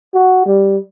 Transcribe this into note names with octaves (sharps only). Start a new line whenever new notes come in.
F#4
G3